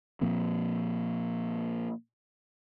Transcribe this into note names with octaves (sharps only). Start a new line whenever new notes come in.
A#2 F3 A#3 C4